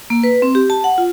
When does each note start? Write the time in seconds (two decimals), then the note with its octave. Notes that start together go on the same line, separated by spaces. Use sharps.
0.10 A#3
0.23 B4
0.42 C4
0.55 G4
0.70 A5
0.84 F#5
0.98 F4